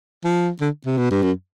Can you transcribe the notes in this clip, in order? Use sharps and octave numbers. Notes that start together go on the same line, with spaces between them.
F3
D3
C3
B2
G2
F#2